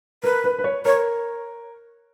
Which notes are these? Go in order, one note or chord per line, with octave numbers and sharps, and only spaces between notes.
A#4 B4
B4
B4
C#5
A#4 C#5